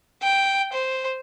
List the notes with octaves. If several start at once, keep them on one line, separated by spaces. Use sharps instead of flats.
G5
C5